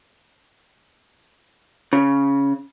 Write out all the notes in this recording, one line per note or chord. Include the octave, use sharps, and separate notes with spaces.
C#3